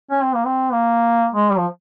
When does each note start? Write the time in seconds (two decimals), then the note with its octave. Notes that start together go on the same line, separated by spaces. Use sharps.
0.11 C#4
0.23 C4
0.35 A#3
0.45 C4
0.72 A#3
1.34 G#3
1.50 G3
1.58 F3